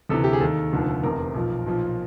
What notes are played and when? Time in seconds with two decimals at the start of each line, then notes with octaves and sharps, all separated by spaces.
0.09 D2 C3 E3 A4
0.24 G4
0.33 G#4
0.41 D#2 D#3 A4
0.73 F1 D#2 D3 F3
1.03 F1 E2 C3 A#4
1.34 B1 A#2 F3
1.66 B1 A#2 F3